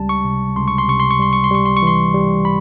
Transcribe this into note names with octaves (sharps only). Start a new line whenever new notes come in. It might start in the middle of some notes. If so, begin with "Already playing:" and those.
Already playing: C#2 G3 A5
C#6
C3
C#2 C6
C#6
C6
C3 C#6
C6
C#6
G3 C6
C#6
C6
G3 C#6
C6
C#6
E3 C6
G3
B5